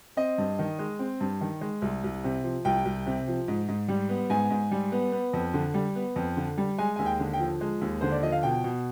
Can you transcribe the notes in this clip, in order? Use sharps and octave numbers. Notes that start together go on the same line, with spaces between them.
C4 D#5
G2
D#3
G#3
C4
G2
D#3
G#3
C2
C2
C3
F3
C2 G5
C2
C3
F3
G#2
G#2
G3
B3
G#2 G#5
G#2
G3
B3
B3
F2
D3
G3
B3
F2
D3
G3
G#3 G#5
D#2 G#5
G5
D3
G5
F3
G#3
D#2
D3 C5
D5
F3 D#5
F5
B2 G5
B2